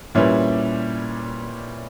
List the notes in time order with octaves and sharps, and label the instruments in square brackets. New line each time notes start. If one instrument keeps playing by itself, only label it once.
[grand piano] A#2 G3 C#4 E4 B4